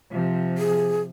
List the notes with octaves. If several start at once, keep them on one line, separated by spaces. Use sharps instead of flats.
C3 F3
G#4